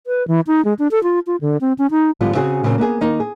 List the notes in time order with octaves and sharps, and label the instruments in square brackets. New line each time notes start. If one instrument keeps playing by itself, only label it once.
[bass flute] B4
E3
D#4
G#3
D4
A4
F4
F4
D3
C4
C#4
D#4
[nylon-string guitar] G#2 D3 F3 G3 B3 F4
C#3 C4 C#4 F#4 G#4
A#2 C#3 F#3 C4
A#3 B3 E4 G#4
D#3 A#3 D#4
G#4